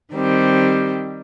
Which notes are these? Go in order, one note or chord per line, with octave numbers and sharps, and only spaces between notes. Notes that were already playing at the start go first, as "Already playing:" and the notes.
D#3 G3 C4 G4